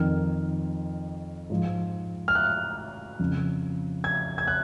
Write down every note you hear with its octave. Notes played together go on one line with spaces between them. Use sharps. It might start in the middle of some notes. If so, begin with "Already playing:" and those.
Already playing: F2 D#3 F6
G#2 F3
F6
F#6
F2 C#3 F3
G#6
G#6
F#6